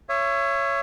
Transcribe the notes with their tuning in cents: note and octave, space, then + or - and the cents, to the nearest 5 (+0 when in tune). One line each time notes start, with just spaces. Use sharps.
C#5 +0 E5 +35 D#6 +0